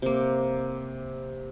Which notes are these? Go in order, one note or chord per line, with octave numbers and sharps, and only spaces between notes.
C3 A#3